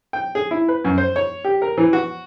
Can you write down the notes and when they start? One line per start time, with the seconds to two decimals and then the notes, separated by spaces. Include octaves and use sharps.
0.13 G5
0.35 G#4
0.51 E4
0.68 B4
0.84 F#2
0.98 C5
1.16 C#5
1.45 G4
1.62 A#4
1.77 E3
1.93 F#4